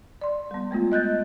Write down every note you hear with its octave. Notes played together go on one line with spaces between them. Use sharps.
D5 C6
G3 B3
G#3 A3 B3 F4
D#5 F#6 G6 A6